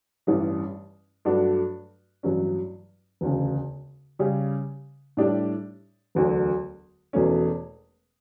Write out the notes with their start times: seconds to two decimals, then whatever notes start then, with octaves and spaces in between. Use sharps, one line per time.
0.27 A1 G2 E3 G3 C#4
1.25 G2 F#3 A3 D4 F#4
2.23 A1 G2 F#3 C#4
3.21 E1 D2 C#3
4.19 C#3 G3 C#4 G4
5.17 A2 G3 D4 G4 D5
6.15 E1 D2 D3 F#3
7.13 E1 E2 B2 A3 C#4